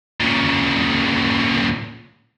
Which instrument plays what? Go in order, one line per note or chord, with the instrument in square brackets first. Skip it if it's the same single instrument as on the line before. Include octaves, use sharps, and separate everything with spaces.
[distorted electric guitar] A#2 C#3